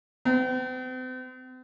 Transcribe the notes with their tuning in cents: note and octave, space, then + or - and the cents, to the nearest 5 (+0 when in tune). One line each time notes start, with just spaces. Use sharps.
C4 -40